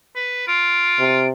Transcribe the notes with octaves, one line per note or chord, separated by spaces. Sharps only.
B4
F4 D7
C3